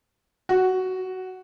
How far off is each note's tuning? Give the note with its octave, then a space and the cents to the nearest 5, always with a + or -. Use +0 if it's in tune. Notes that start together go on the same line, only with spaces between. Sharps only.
F#4 +10